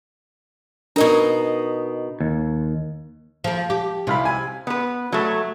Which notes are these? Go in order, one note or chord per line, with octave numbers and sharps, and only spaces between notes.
B2 D4 D#4 A#4 A#5
D#2
F3 A#3
G4
C2 C3 F5 B5
G#5
B3 B4
F#3 A3